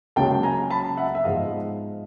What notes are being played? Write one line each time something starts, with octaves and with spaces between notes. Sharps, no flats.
C#2 C#3 F#3 A#3 G5 A5
G#5 A#5
A5 B5
E5 F#5
E5
G#2 F3 G#3 B3 D#5 F5